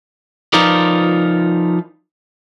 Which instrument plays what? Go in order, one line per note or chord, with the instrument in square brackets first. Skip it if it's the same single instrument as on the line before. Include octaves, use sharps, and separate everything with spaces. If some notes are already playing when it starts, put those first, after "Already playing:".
[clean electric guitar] F3 D#4 F4 A#4 B4 D5